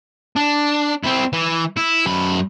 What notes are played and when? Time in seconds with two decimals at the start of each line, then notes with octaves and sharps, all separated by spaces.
0.36 D4
1.04 C4 E4
1.33 E3
1.77 E4
2.06 F#2 B5